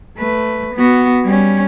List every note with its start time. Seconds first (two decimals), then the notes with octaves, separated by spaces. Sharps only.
0.18 A3 B4
0.75 B3 F#4
1.24 G3 C#4